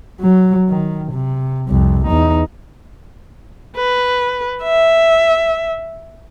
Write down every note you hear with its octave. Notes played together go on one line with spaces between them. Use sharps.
F#3
D#3
C3
C2 F2
E2 D#4
B4
E5